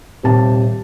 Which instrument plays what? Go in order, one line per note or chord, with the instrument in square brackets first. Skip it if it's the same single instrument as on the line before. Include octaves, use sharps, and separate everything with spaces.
[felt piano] D#1 A5 [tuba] C3